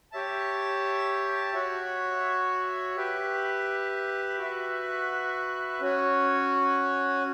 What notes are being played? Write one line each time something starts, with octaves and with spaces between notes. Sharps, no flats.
G4 C#5 E5 A5
F#4 C#5 E5
G4 B4 E5
F#4 B4 E5
C#4 F#4 C#5